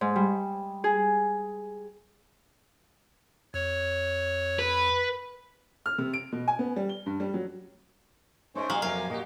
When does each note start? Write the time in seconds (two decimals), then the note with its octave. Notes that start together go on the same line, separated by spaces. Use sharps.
0.01 G#2
0.16 G3
0.84 G#4
3.54 F2 C#5
4.59 B4
5.86 F6
5.98 C3
6.14 D7
6.32 B2
6.48 G#5
6.59 B3
6.76 G3
6.89 G7
7.06 G2
7.20 G3
7.34 F#3
8.55 G#3 A3 C#4 D#4 C5 C#5 D#5
8.70 A2 F#3 G3 F5
8.82 F2 C3 F#3 A3 A#3 A#4 F5 G#5
9.10 A#2 A#3 F#4 G4 D#5